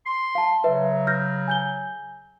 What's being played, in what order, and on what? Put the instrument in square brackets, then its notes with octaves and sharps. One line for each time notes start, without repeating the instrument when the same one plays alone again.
[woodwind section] C6
[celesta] F5 A5
[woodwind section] C#3 F#3 [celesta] B4 E5
[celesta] F6 G6 A#6
G#5 G6 G7